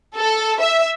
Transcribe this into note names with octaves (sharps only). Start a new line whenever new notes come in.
A4
E5